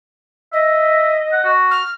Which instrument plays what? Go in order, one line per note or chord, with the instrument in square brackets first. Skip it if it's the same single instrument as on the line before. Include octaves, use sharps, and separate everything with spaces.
[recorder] D#5 [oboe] E5
[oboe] F#5
F#4
[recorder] F6